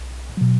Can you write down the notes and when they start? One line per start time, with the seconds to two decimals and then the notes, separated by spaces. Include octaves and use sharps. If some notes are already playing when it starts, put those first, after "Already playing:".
Already playing: B1
0.37 B2 F#3